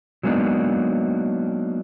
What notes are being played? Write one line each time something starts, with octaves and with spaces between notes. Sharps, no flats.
F#3 G#3 A#3 B3 D4 D#4